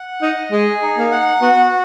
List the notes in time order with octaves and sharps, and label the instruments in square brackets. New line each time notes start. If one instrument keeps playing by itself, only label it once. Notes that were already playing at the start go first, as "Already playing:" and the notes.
Already playing: [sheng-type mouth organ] F#5
[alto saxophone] D#4 [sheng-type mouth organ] D#5
[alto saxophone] G#3 [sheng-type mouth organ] G#4
[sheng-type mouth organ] D#4
[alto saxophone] A#3
[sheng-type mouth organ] F#5
[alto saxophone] B3 [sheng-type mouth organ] F#4